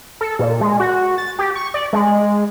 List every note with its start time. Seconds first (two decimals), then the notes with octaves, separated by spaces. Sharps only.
0.21 A4
0.39 A#2
0.61 G#3
0.80 F#4
1.18 A6
1.39 G4
1.55 C#6
1.74 D5
1.93 G#3